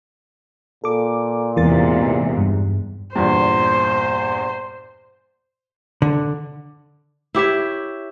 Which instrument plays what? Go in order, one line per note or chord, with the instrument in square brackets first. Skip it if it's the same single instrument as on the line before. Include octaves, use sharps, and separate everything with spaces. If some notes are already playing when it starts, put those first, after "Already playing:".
[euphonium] A#2 [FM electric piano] A4 D6
[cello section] E2 G#2 C3 [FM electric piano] E3 A#4 A6
[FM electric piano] G2
[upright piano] E2 G2 A#2 [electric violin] C5
[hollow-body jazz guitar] D3
[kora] E4 G4 C#5 E5